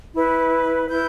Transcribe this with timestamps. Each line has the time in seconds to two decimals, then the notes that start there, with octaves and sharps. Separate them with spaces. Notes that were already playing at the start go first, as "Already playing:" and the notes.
0.13 E4 B4
0.88 E4 B4 G6